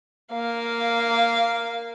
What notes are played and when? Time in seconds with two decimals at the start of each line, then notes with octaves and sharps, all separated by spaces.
0.33 A#3 F5